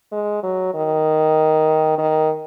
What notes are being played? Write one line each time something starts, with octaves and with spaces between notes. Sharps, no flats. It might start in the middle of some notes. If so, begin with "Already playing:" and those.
G#3
F#3
D#3
D#3